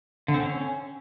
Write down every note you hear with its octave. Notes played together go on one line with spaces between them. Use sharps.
D3
C4
C#4